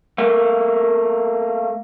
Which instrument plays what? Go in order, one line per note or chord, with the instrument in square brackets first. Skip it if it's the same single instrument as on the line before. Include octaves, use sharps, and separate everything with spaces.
[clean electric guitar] A3 A#3